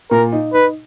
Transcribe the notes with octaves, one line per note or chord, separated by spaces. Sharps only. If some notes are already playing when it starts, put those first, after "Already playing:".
A#2 A#4
D#4
D#4 B4